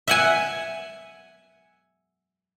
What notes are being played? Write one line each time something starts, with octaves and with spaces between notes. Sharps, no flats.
E5 F#5 G#5